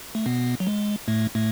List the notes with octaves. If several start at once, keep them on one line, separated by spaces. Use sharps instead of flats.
A3
B2 B3
F#3
G#3
A2 A3
A2 A3